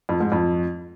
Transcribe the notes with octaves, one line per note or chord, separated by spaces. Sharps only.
F2
G#2
F2